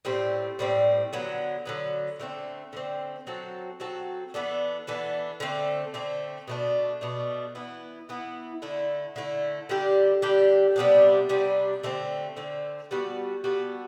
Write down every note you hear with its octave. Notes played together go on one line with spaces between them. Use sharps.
A2 G3 C4
A2 G3 C4
D3 F#3 B3
D3 F#3 B3
D3 A3 C4
D3 A3 C4
F#3 C4 F#4 A4
F#3 C4 F#4 A4
E3 B3 D4 A4
E3 B3 D4 A4
D3 A3 C4
D3 A3 C4
B2 A3 D4
B2 A3 D4
E3 B3 E4
E3 B3 E4
D3 A3 E4
D3 A3 E4
D3 G3 D4 G4
D3 G3 D4 G4
C3 G3 B3 D4
C3 G3 B3 D4
D3 A3 C4
D3 A3 C4
G3 B3 F#4 A4
G3 B3 F#4 A4